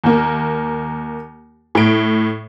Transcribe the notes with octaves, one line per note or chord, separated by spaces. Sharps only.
D#2 A#3
A2 D7